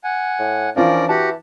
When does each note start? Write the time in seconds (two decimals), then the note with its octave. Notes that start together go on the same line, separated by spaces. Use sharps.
0.04 F#5 G#5
0.39 A2
0.76 E3 F3 C#4 D4 F4 A#4 D5
1.09 E3 F#4 G4 F#5 A5